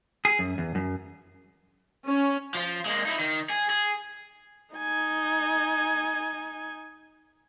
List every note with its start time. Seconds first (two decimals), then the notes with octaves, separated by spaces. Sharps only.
0.25 G#4
0.39 F#2
0.58 E2
0.75 F#2
2.07 C#4
2.55 F3 F4
2.86 G#3 A#3
3.05 D#4 E4
3.19 D#3
3.50 G#4
3.70 G#4
4.75 D#4 G#5